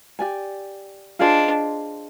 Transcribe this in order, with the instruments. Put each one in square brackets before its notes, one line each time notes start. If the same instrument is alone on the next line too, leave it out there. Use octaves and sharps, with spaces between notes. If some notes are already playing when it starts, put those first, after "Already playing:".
[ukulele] G4 D5 G#5
[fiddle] D4 [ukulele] F4 G#4 C5 D#5